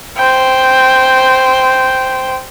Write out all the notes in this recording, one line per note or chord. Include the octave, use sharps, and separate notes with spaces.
C5 G5